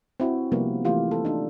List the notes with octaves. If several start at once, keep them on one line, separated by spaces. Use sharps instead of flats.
C4 E4 F#4
C3 F3 G3 A#3 B3 D4
E3 A3 F4 G4
A4
D4 D#4